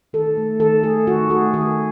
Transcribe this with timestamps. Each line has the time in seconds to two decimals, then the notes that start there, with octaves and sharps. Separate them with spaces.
0.13 D#3 A4
0.37 A3
0.60 D#3 A4
0.83 A3 G#4
1.07 D#3 F#4
1.30 A3 G#4
1.54 D#3 G#4